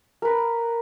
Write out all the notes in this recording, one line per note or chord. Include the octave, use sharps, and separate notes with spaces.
A#4 B4